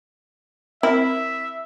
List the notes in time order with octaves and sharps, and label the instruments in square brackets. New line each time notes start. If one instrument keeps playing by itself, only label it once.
[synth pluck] C4 A#4 B5 [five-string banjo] E4 [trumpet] E5